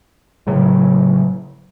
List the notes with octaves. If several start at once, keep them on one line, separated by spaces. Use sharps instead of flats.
A2 C#3 F#3